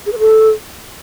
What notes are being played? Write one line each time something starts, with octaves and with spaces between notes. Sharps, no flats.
G#4
B4
A4